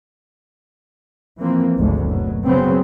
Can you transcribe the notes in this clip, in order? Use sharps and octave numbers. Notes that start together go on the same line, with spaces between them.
E3 F3 A#3 C4
G#1 D2 G#2
F#1 B2 F#3
C#3 F#3 B3 C4